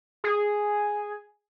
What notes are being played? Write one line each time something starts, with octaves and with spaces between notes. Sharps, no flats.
G#4